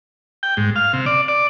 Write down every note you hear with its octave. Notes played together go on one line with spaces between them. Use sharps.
G5
G#2
F5
C3
D5
D5